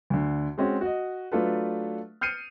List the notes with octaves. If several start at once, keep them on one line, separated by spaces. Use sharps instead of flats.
D2 D3
G#3 C4 C#4 F#4
F#4 D#5
F#3 A3 D4 F4 A4 B4
F6 G6 C7 C#7 D#7